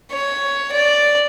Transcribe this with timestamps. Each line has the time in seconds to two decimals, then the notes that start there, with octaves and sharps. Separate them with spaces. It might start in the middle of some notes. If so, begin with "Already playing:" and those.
0.12 C#5
0.73 D5